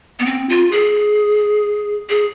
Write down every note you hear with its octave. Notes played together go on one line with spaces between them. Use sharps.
B3
C4
F4
G#4
G#4